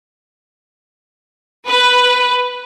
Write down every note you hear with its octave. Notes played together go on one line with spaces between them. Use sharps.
B4